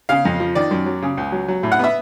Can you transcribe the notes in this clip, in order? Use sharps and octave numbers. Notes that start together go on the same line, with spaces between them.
C#3 F5
F2
F3
D#3 D5
F#2
F#3
C#3
C#2
F#3
F#3
A2
F#5
B3 E5